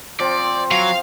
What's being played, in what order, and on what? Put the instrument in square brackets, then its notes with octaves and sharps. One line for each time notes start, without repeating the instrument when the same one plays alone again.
[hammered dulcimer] F3 C4 [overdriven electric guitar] D5
[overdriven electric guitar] F#3 [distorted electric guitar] F5